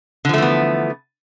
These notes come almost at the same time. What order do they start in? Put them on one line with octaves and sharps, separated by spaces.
D3 F3 A3 E3 B3